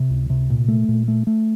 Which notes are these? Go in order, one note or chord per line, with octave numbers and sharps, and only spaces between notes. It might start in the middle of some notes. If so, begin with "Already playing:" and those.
Already playing: C3
C#2
C3
A#2
A3
A#2
A3
A3